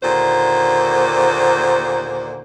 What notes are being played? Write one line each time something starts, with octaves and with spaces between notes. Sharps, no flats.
D#2 A#2 D3 C5